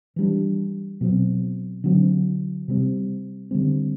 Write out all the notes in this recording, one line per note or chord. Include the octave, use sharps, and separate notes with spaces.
E3 G3 D4
B2 F#3 C4
D3 F#3 C4
C3 G3 C4
D3 G3 C4